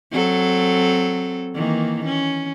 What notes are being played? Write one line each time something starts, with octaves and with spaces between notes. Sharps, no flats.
F#3 C4 A4
D#3 E3 A#3
C#4